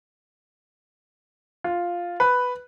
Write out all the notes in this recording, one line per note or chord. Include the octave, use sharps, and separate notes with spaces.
F4
B4